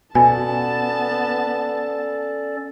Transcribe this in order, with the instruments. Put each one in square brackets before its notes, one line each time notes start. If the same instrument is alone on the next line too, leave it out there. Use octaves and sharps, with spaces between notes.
[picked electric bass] B2 [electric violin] B3 A5 [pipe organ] C#4 A4 D5 [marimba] G#5